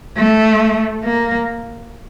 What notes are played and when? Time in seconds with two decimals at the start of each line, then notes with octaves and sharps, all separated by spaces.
0.17 A3
1.04 A#3